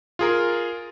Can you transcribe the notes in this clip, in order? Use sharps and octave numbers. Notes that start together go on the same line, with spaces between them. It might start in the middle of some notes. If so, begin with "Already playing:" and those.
F4 G#4 A#4